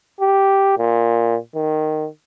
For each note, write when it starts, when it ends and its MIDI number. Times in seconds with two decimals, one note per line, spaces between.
0.21 0.74 67
0.78 1.37 46
1.55 2.07 51